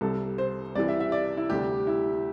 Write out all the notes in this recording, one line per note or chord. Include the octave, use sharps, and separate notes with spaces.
C2 C3 G3 A4
C5
C2 C3 E3 D5
E5
E5
D5
E4
D2 C3 G3 G4
E4